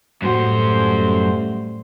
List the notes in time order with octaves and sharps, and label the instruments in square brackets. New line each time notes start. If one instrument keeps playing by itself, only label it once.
[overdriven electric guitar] F#2 F#5 [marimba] A2 A#3 F#4 [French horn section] G3 A3 [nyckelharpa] C5